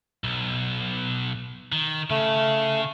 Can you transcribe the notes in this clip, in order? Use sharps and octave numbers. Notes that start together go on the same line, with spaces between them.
B1
D#3
C#3 A3